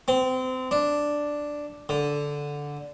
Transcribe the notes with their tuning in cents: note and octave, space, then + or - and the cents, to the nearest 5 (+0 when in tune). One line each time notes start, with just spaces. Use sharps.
C4 -30
D4 +0
D3 -10